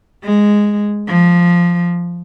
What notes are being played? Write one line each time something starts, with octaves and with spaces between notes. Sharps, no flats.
G#3
F3